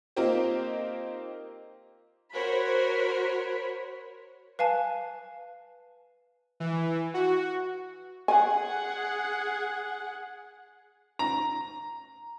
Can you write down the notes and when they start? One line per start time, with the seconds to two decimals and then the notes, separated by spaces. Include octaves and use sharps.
0.16 A#3 C4 D#4 F4 G4 C5
2.33 F#4 A#4 C5 C#5 B5
4.59 B4 F5 G#5 A5
6.60 E3
7.14 F#4
8.28 G#4 F#5 G#5
11.19 A#5